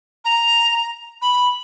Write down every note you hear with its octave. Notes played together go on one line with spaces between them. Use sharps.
A#5
B5